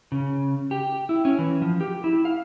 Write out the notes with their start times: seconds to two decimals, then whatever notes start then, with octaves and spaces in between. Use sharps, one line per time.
0.12 C#3
0.71 G4
1.09 E4
1.25 C#4
1.39 E3
1.62 F3
1.81 G4
2.04 E4
2.25 F5